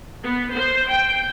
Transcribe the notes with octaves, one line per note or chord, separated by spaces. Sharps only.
B3
C5
G5